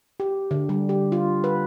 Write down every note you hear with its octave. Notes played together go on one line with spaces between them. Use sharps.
G4
D3
G3
G4
F4
B4